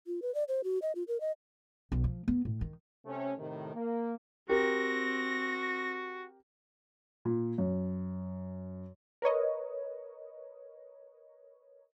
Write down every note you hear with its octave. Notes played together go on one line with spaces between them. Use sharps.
F4
B4
D5
C5
F#4
D#5
F4
A#4
D#5
B1
F3
B3
A2
D#3
C3 A3 C#4
A2 C3 D#3
A#3
C4 F#4 G4 A#4 A#6
A#2
F#2
A#4 B4 C#5 D#5